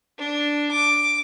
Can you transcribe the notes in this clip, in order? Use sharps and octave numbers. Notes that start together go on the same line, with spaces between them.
D4
D6